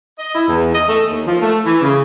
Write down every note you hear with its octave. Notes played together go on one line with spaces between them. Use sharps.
D#5
E4
E2
D#5
A3
D#2
F3
A3
E3
C#3